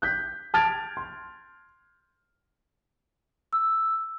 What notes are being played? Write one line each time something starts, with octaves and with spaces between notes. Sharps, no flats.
F#6 G6 B6
A5 F6 G#6 A6 D7 F7
C6
E6